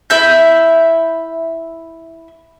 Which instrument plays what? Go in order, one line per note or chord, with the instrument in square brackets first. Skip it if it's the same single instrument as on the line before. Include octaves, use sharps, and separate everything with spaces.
[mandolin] E4 E5 G6